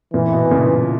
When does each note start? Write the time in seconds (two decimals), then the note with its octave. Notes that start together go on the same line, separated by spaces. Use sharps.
0.13 A#2 E3
0.32 B2
0.51 A#2 C#3